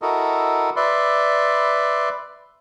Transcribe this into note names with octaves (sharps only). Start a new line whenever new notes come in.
E4 F#4 A4 A#4 D#5
B4 D5 E5 C6